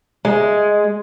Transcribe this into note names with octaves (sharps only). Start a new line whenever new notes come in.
G#3